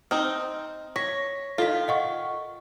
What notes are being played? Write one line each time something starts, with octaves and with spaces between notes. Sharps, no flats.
C4 D#4 F6
C#5 A#6 B6
D#3 F4 A4 B6
D#5 F#5 C#6